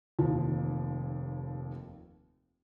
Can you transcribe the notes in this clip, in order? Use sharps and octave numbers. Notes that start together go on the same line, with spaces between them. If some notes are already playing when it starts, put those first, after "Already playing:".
F1 D#2 F3